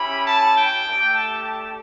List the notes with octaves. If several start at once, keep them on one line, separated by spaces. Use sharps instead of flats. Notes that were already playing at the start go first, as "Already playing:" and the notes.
Already playing: C#4 E4 G4 B5
A5
G5
A3 D4 G4
A5
A5